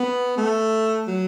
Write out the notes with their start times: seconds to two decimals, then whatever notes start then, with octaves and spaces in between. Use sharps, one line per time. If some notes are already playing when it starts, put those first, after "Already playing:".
Already playing: B3
0.37 A3
1.07 F#3